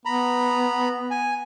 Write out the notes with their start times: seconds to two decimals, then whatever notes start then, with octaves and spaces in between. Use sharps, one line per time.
0.05 B3 A#5 B5
1.10 G#5